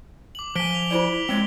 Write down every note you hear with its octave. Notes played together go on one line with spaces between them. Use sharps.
D6 F#7
F3 G#5 B6 D7 G7
F7
E4 F4 C5 D5
G#3 C4 C#5